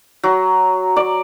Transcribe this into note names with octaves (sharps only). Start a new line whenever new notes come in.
F#3
D5